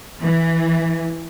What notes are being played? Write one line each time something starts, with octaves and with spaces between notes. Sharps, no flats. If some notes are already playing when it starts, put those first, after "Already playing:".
E3